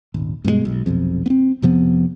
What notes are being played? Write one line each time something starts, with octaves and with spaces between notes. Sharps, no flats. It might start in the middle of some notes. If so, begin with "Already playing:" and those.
D#1 G#1
G2 B2 D#3 G#3
B1
F1 B1 F2
B3 C4
F2 C3 F3 B3